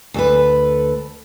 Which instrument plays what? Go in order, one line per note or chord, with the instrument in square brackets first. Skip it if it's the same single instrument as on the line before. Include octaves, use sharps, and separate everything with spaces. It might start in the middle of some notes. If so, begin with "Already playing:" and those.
[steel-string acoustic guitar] D2 A4 B4